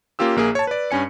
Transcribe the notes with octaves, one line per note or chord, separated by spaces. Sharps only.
A#3 C#4 F4 G4 E6
A#1 A#3 G#4
C#5 A5
B4 D5
G2 C#4 G#5 C#7